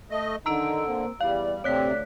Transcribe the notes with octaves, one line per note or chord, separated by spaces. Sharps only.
A3 D#5
D3 D#3 D#4 A#5 E6 D7
A#3 C4
E2 G3 E4 D5 F5
D2 C3 A3 C4 C#5 D5 F#6 B6